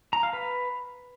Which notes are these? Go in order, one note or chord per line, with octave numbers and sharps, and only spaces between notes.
A#5
F5
B4